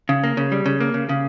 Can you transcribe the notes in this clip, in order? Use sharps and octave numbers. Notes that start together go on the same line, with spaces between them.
C#3
A#3
C#3
G3
C#3
A#3
C#3
C#3